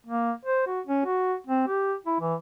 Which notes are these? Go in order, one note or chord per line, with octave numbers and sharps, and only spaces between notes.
A#3
C5
F#4
C#4
F#4
C4
G4
E4
E3